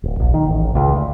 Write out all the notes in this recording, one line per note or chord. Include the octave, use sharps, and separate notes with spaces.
D1
A#1
D#3
A1
C#2
D2